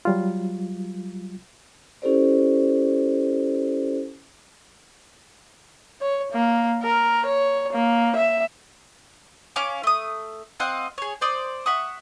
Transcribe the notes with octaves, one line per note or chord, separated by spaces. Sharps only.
F#3 G3 F4
C#4 E4 G4 A4 C5 D5
C#5
A#3
A#4
C#5
A#3
E5
C#4 G#4 F5 D6
A3 D#6
C4 D#5 F5 F#5
G#4 C#5
C5 D5 D#6
E5 F#5 C#6 D#6